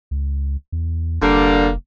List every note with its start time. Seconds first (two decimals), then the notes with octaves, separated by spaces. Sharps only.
0.11 C#2
0.72 E2
1.22 F1 D3 G3 A#3